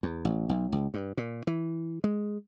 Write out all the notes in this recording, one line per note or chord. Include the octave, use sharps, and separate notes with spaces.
E2
A1
B1
C#2
G2
A#2
E3
G#3